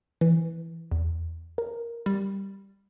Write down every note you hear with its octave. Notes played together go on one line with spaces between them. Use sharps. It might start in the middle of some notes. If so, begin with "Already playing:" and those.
E3
E2
A#4
G3